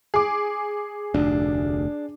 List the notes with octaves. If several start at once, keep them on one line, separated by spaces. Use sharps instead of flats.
G#4 D6
F1 D2 D4